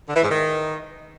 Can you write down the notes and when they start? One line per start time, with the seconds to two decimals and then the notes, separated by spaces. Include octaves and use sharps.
0.08 D3
0.15 E3
0.22 G#2
0.30 D#3